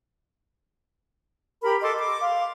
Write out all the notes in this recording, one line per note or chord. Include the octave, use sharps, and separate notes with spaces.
G4 A#4 B5
A4 D#5 C6 D6
D6
F5 C6